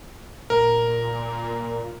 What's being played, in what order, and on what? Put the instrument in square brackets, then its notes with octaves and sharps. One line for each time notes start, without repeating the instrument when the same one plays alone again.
[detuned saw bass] A#2 [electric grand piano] A#4